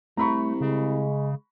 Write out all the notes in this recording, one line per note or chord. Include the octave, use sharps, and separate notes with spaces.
C2 A3 A#5 B5 C#6
C#3 G#3